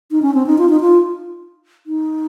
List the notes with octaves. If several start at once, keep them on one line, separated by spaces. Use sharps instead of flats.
D#4
C#4
C4
D#4
F4
D#4
F4
D#4